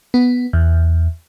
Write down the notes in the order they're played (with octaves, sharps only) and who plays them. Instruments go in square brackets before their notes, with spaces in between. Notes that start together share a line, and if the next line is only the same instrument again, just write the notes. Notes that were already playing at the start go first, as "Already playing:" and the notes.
[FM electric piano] B3
E2